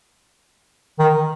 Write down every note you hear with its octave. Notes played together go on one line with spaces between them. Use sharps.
D#3